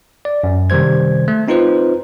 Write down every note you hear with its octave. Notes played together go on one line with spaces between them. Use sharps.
D5
F#2
C3 D#3 G3 C5 G#6
A3
C4 D#4 F4 B4 C5